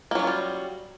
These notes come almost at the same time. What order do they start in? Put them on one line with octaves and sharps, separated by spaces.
A#3 F#3 C#4 F4 G3